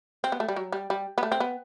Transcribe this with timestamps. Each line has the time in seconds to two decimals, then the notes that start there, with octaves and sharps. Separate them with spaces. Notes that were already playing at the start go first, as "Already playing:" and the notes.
0.24 C4
0.32 B3
0.40 A3
0.48 G3
0.56 F#3
0.72 G3
0.90 G3
1.18 B3
1.23 A3
1.32 C4
1.40 B3